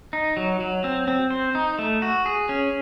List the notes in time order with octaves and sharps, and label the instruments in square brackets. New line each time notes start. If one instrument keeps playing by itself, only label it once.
[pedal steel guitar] D#4
F#3
F#3
C4
C4
C5
D#4
A3
F#4
G#4
C#4